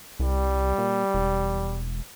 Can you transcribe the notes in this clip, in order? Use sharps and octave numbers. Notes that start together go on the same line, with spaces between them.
C2 G3
A#2
E1